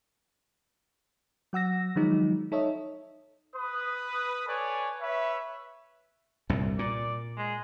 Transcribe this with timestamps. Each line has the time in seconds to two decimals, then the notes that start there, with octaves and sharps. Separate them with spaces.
1.53 F#3 F#5 E6 A#6
1.96 D#3 F3 F#3 G#3 D#4
2.52 D#4 A4 C#5 D#5 E5
3.56 B4 D#6
4.47 A4 B4 C#5 D5 G#5
5.01 B4 C#5 E5
6.50 C2 G2 A#2
6.79 A#2 D5
7.37 G#3